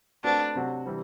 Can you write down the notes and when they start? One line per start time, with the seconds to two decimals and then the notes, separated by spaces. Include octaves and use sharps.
0.24 A3 C4 D4 F#4 B4
0.55 C3 F#3 C4 F#4
0.86 C3 E3 G3 C4